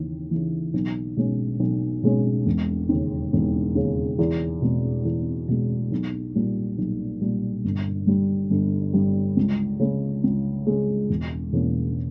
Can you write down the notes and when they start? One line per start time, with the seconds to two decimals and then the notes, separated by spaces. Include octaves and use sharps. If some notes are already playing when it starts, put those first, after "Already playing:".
Already playing: D#2 C#3 E3
0.31 C#3 E3
0.74 B1
1.17 B2 G#3 C#4
1.60 B1
2.03 B2 G#3 C#4
2.46 E1
2.89 D#2 C#3
3.33 E1
3.75 D#2 C#3
4.19 E2
4.62 B2 G#3
5.05 E2
5.49 B2 G#3
5.92 B1
6.35 A#2 G3
6.78 B1
7.21 A#2 G3
7.64 G1
8.07 G2 G3
8.50 G1
8.93 G2 G3
9.37 C#2
9.80 C#3 G#3
10.24 C#2
10.67 C#3 G#3
11.10 E1
11.52 E2 B2 A#3 C#4